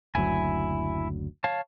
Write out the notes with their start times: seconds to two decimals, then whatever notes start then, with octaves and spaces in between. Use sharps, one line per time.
0.15 F#1 D2 F#3 E4 G#5
1.44 C#5 F5 A5